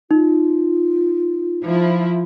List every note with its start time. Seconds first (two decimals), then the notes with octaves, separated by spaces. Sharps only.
0.11 D#4 F4
1.66 F3 E4